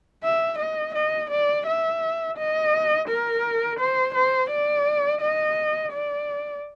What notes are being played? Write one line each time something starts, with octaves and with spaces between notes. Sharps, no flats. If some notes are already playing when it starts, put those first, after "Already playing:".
E5
D#5
D#5
D5
E5
D#5
A#4
C5
C5
D5
D#5
D5